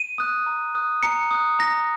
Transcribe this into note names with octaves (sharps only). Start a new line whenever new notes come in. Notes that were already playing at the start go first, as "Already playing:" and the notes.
Already playing: D#7
D#6 F#6
A#5
D#6 F#6
A#5 C#7
D#6 F#6
A#5 A#6